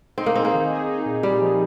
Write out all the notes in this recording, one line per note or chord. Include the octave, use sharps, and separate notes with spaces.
C4 D#4
A#3
C4 G#4
A#3
D#3
G#4
D#4
A#2
A#2 G3
F3